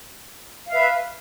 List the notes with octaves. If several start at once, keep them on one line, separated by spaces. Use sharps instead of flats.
B4 E5 F5